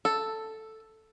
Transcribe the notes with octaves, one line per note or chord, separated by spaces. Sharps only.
A4